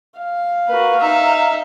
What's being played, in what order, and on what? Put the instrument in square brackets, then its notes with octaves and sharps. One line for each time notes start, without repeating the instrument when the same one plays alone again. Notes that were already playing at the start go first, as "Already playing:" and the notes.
[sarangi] F5
[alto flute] A#3 [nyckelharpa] F#4 B4
[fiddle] D#4 [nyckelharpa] E5 [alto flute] A#5